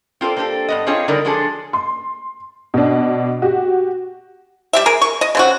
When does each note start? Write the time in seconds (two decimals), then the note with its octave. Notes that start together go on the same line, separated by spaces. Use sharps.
0.21 C4 F4 A4 C5 D5
0.37 A#3 C4 D4 G4 A4
0.69 G2 B3 D#5
0.87 C4 D4 F4 G#4 C#5 D#5
1.08 D3 G3 A#3 D#4 A#4 D5
1.25 F3 F#3 G#3 D4 G#4 A4
1.73 C6
2.74 B2 D4
3.42 F#4 G4
4.73 G3 G4 E5
4.86 G#4 A#4
5.02 C#6
5.21 D#5
5.35 C#3 C4 F#4